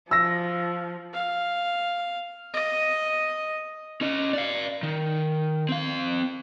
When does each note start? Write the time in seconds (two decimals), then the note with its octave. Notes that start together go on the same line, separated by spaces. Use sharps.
0.11 F3 E6 A#6
1.13 F5
2.54 D#5
4.01 C#4 D#5
4.33 D5 F5
4.83 D#3
5.69 C4 F5